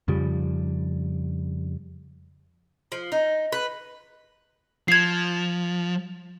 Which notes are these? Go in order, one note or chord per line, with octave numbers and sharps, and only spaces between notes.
F2 C#3 F3 G3
F3
D#4
B4
F3 G#6 C7